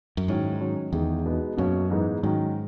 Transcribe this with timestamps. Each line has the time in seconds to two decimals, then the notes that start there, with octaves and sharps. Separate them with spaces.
0.17 F#2
0.28 G#2 D#3 F#3 C#4 E4
0.60 D#3 F#3 C#4
0.92 E2 D#3 G#3 D#4
1.26 B2 G#3 B3 D#4
1.57 F#2 B2 A#3 C#4
1.90 G#2 E3 G#3 B3 D#4
2.23 G#2 D#3 F#3 C#4